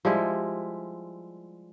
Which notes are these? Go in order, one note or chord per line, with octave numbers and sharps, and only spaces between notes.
F3 G3 G#3 E4